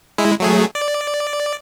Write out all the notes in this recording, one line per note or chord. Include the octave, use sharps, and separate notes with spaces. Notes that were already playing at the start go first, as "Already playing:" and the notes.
G#3 E4
F#3 A3 G#4
D5